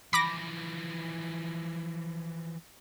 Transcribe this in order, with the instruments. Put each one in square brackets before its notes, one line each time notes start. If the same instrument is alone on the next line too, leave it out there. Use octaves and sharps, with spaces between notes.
[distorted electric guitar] E3 F3 [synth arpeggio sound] B5 D6 A#6